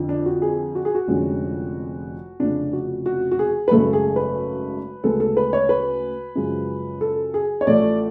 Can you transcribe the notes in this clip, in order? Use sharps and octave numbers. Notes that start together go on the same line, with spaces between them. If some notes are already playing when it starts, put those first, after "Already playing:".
Already playing: F2 D3 F3
D4
F#4
G#4
F#4
G#4
F#4
F1 F2 D3 G#3 C#4
F1 F2 C#3 D4
F#4
F#4
F#4
G#4
B4
G#1 F#2 C#3 F#3 A3 A4
G#4
B4
D2 C#3 G#3 B3 A4
A4
B4
C#5
B4
F#2 C#3 F3 G#3
A4
G#4
C#5
A1 A2 F3 A3 D5